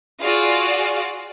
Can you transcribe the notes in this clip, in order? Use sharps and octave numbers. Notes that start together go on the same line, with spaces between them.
F4 F#4 G#4 D5 F5